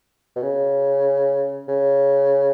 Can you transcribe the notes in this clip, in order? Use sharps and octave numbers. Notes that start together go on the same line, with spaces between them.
B2
C#3
C#3